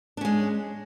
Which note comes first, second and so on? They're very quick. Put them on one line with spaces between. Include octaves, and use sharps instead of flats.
D4 C#4 G#3